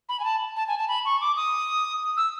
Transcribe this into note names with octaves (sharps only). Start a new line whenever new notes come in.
B5
G#5
A5
A5
G#5
A5
B5
C#6
D6
D#6
E6